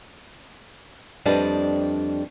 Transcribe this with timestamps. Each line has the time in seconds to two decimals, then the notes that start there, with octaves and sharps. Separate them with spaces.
1.25 F2 G3 D4 B4 D#5